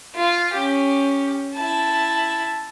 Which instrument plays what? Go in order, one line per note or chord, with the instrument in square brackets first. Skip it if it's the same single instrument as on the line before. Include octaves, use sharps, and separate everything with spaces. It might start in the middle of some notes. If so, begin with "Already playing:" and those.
[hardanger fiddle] F4
C#4 G4
E4 A5